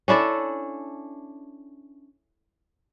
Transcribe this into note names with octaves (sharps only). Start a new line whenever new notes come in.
C#4 D4 E4 A4